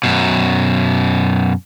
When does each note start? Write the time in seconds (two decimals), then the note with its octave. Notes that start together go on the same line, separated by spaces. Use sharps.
0.03 F#2 B2